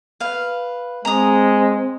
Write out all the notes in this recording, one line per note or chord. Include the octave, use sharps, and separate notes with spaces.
B4 F5
G#3 C4 A#5 D#6